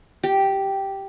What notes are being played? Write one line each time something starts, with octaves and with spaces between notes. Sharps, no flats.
G4